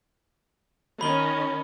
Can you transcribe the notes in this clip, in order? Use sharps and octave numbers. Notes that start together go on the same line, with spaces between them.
D#3 C#4 B5 G7